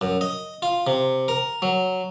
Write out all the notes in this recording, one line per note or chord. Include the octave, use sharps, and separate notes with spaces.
F#2
D#5
F4
C3
A#4
F#3